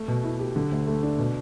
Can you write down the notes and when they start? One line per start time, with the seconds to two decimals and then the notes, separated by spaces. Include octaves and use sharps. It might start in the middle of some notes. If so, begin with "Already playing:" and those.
Already playing: A3
0.08 B2
0.23 E4
0.39 G4
0.56 D3
0.71 D2
0.87 A3
1.03 D4
1.19 B2